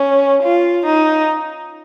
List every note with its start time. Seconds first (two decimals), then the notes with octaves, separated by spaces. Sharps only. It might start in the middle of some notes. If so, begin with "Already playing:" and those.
Already playing: C#4
0.43 F4
0.86 D#4